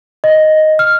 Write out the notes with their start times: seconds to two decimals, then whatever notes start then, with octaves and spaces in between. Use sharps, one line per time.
0.24 D#5
0.79 F6